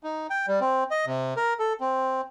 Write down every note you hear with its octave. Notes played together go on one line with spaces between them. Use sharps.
D#4
G5
G3
C4
D#5
C3
A#4
A4
C4